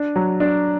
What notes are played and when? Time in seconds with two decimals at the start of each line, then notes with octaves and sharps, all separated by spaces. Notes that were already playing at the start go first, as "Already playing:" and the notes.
Already playing: D4
0.16 F#3
0.40 D4